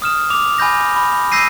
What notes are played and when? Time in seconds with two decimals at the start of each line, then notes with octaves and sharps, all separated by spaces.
0.02 D#6 F6 E7
0.30 D6 F7
0.58 G#5 B5 G6 A#6
0.96 B5
1.32 E6 G6 A#6 C7 D#7